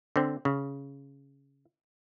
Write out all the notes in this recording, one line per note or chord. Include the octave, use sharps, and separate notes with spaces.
D3 C4
C#3